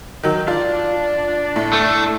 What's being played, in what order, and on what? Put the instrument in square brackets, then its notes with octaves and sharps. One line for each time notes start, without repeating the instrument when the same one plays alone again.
[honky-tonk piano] D#3 F#3
[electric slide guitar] D4 D5 [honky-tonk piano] F4
[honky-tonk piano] A2
[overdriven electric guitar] A3